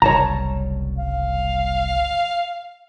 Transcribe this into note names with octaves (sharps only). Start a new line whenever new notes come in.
F#1 C2 G3 C#5 A5 A#5
F5